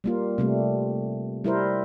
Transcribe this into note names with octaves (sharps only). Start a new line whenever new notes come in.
G3 A#3 F4
C3 G3 A3
G3 E4 A#4 C5